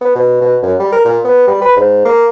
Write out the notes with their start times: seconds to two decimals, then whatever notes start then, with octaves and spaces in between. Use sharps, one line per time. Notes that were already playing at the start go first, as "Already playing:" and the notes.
0.01 B3
0.16 B2
0.41 B2
0.62 F#2
0.79 G3
0.92 A#4
1.05 A#2
1.25 B3
1.47 G3
1.61 B4
1.77 G#2
2.05 A#3